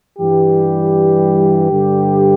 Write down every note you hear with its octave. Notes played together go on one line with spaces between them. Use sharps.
G2 E3 G3 G4
G2 D3 G3